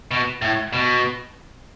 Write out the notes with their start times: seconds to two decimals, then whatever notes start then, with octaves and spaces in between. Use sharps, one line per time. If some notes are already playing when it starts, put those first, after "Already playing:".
0.11 B2
0.42 A2
0.73 B2